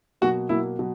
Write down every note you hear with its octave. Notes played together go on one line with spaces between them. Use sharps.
B2 F#3 A#3 F#4
B2 F#3 A#3 E4
B2 F#3